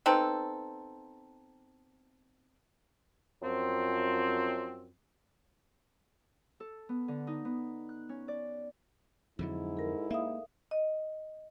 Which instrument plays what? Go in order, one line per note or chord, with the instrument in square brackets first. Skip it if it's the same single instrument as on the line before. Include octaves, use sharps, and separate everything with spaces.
[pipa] B3 C4 D#4 A4
[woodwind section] F#2 F3 C4
[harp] A4
B3
D3
D#4
B3
F#6
C#4
D5
[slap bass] F2 D3 F#3 [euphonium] G#2 [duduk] E4
[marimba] A4 A#4
[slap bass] A#3 [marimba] E5 F5 D#6
[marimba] D#5